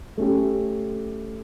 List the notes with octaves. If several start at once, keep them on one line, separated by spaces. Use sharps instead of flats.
A3 C#4 G4